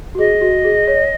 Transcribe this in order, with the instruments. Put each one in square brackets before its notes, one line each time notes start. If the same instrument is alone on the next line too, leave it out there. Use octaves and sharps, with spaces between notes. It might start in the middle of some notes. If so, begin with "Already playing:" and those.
[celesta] F#4
[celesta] G#4 [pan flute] D#5
[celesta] F#4
G#4
C#5